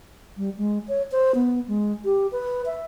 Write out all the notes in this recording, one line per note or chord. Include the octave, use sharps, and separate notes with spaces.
G3
G#3
C#5
C5
B3
G#3
G4
B4
E5